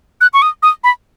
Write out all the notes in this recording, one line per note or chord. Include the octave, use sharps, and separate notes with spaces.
F#6
C#6
D#6
D#6
B5